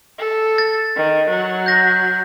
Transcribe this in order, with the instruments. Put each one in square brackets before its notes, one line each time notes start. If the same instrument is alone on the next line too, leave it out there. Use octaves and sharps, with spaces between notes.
[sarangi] A4
[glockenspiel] A6
[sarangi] D#3
F#3
[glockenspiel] G6 A#6